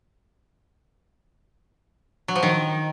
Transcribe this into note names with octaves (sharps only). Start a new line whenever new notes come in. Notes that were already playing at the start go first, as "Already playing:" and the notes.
F#3
F3
D#3